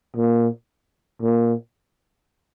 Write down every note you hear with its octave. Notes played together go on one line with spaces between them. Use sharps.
A#2
A#2